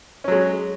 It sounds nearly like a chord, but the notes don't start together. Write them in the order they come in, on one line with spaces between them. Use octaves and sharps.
C#4 F#3 G#3